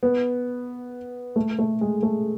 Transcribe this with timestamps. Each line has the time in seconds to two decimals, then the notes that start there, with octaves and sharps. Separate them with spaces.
0.03 B3
1.36 A3
1.59 A3
1.81 G#3
2.03 A3